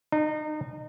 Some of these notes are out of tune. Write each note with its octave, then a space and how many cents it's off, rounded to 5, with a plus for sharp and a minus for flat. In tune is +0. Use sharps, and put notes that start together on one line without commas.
D#4 -30